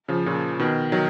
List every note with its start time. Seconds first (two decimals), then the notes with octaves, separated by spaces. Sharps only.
0.08 C#3 F3
0.26 A#2 C#3
0.59 B2 D#3
0.92 D#3 F#3